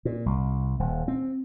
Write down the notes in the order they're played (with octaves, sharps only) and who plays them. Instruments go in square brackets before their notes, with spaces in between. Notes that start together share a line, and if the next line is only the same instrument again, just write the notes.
[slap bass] A#2
C2
D#1
C4